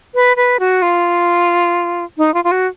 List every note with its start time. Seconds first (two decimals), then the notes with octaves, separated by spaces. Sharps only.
0.15 B4
0.37 B4
0.60 F#4
0.82 F4
2.18 D#4
2.34 F4
2.44 F4
2.52 F#4